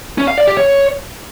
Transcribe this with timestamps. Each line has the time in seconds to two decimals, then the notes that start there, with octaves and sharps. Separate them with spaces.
0.18 C#4
0.28 F5
0.38 D5
0.47 G4
0.57 C#5